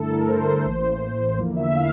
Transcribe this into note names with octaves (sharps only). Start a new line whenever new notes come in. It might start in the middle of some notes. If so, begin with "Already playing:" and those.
Already playing: G2 D3 A3 E4 A4
A#4
C5
A1 A2 E3 A#3
E2 D3 F3 A#3 E4
E5
F5